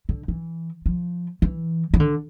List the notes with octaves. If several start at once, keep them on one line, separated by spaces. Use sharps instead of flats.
D3
E3
F3
E3
E3
D3